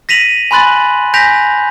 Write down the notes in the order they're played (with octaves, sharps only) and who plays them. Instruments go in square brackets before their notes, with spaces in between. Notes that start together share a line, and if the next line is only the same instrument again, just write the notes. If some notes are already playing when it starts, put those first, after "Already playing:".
[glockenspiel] A#6 B6 D#7 F7 F#7
G#5 B5 C6 F#6 A6 F#7
G#5 G6 A#6 B6 F7